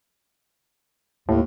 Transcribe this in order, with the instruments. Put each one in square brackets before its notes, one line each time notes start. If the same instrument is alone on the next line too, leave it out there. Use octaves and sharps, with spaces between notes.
[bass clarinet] D#2 [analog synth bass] A2